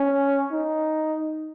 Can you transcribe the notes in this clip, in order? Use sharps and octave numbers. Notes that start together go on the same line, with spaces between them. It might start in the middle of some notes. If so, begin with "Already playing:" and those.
Already playing: C#4
D#4